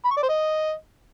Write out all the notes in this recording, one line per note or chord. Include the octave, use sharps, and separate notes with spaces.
B5
C#6
D5
C5
D#5